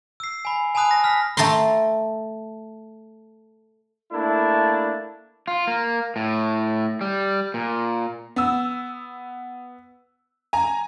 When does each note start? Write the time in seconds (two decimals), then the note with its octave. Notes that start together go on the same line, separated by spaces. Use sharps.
0.20 E6 C7
0.45 G#5 B5
0.75 G#5 A5 B5 D#6 F#6
0.91 A#6
1.03 B5 F6 A#6 B6
1.37 A3 A4 G5 A#5 C6
4.12 A3 A#3 D4 E4
5.48 F4
5.67 A#3
6.16 A2
7.01 G3
7.54 A#2
8.36 B3 E6
10.53 G#5 A#5